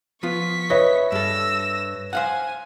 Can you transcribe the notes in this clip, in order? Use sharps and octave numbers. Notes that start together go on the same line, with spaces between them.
F3 B3 F4 C#6 B6
B4 C#5 D#5 E5
G2 A4 E6 A#6
C5 F5 F#5 G#5